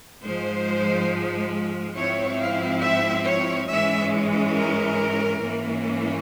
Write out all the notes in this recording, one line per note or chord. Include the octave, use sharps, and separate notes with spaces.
G#2 F3 G#3 C5
G#2 F3 C4 E4 C#5
F5
E5
C#5
G#2 E3 G#3 C#4 E5
A#4
G#2 E3 A#3 C#4